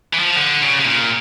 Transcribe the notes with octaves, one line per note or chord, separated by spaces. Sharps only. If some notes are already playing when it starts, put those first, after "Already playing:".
E3
F3
D3
C#3
C#3
A#2